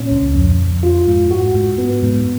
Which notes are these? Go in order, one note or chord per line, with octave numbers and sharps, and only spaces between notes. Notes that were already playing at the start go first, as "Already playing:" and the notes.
Already playing: A#2 C#4
C#2
F2
F2
F4
G#2
F#4
G#2
B3
G#2